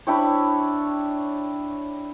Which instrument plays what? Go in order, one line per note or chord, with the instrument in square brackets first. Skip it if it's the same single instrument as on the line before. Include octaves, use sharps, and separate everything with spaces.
[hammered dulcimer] D4 E4 G4 C#5